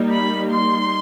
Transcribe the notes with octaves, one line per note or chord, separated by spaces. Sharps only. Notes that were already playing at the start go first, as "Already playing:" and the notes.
Already playing: G3 A#3 D#4
B5
C6